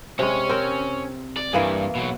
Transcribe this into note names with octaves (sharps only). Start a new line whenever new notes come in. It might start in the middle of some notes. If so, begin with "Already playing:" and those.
C3 G#3 C#4 C#5
C4 A#4
D5
G2 E3 A#3 G#4
B2 F#3